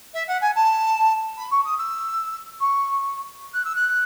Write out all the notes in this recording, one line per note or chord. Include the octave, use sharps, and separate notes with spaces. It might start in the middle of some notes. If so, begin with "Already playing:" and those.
E5
F#5
G#5
A5
B5
C#6
D#6
E6
C#6
F#6
E6
F#6